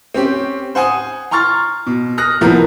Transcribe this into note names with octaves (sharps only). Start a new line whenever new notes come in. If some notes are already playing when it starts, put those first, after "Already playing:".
C4 C#4 G4
C5 F#5 G#5 D#6
A#5 C6 C#6 F6 A6
B2
D#6 F6 F#6 A#6
C2 A#2 F3 B3 E4 A#4